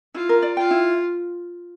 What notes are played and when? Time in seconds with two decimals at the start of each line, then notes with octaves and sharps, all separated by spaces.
0.14 E4 F4
0.29 A#4
0.42 D5
0.57 F4 G5
0.71 E4